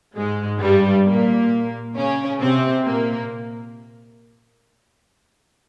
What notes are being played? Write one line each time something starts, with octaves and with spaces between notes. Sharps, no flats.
G#2 G#3
G2 G3
A#2 A#3
C#3 C#4
C3 C4
A#2 A#3